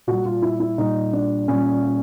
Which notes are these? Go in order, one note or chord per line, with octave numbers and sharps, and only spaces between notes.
A#2 G3 F#4
F4
E4
E4
A#2 G3 D#4
D4
A#2 G3 C#4